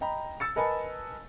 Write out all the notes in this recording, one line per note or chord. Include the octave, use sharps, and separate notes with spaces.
D#5 G5 A#5 B5
E6 A6 C#7
A#4 B4 D#5 G#5 A5 B5